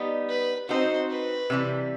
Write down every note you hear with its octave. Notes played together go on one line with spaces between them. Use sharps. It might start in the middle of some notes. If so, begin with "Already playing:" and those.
Already playing: G3 B3 D#4
B4
C4 D#4 F#4 C5
B4
C3 E3 G3